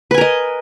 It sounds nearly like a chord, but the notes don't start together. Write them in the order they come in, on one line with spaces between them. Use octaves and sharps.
B4 G#5 A#4 D#5